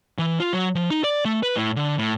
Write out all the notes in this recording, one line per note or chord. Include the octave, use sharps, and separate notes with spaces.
E3
F4
F#3
F3
D#4
D5
A3
B4
A2
D3
A2